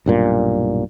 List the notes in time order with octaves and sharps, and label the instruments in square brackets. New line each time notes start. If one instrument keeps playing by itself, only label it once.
[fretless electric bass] B1 G2 A#2